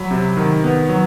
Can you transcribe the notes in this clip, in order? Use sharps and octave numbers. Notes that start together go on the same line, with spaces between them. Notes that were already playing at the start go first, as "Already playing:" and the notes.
Already playing: F#3 B5
C3
D#3
B3
F#3